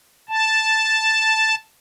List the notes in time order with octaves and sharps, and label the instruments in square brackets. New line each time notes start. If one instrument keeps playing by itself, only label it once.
[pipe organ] A5